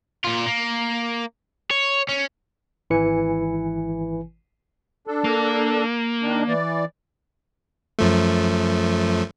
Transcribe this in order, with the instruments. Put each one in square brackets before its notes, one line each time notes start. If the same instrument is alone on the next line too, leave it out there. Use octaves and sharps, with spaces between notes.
[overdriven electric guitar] A#2 F4
A#3
C#5
C#4
[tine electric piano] G#1 E3 E4 B4 G#5 C#7
[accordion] D4 A4
[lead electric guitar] A#3
[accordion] D#3 D4
E3 D5
[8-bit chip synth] F#2 F3 A3